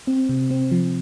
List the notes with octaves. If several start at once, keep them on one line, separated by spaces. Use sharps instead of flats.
C4
C3
C4
F3